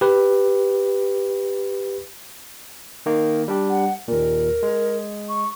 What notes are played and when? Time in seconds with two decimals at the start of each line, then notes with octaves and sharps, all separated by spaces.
0.01 G4 B4
3.06 D#3 A#3
3.48 G3 D4 G4
3.69 F#5
4.08 D#2 A#2 A#4
4.63 G#3
5.29 C#6